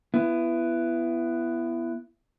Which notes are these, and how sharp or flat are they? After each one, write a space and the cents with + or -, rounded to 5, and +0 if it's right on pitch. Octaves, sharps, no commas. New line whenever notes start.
B3 +0 E4 +25